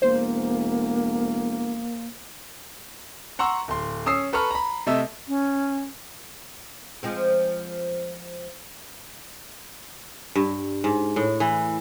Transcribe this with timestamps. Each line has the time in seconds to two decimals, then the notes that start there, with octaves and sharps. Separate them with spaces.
0.02 E1 A#3 C5
3.39 F#5 A#5 C6 C#6 E6
3.68 D1 C6
4.06 C#4 D#6 E6 C7
4.33 A4 B4 A#5 C#6 F6
4.51 A#5 B5
4.87 C3 A3 D#5 E5 E6
5.28 C#4
7.03 F3 G#3 C4
10.35 G2
10.84 G#2
11.16 A2
11.40 E3